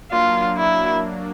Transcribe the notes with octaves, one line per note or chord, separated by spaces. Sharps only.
F#3 A#3 D4 F4
E4